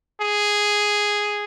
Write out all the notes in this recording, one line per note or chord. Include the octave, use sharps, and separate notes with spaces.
G#4